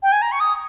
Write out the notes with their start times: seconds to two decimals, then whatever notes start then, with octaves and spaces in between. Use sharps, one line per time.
0.02 G5
0.12 G#5
0.22 A#5
0.31 C#6
0.40 D#6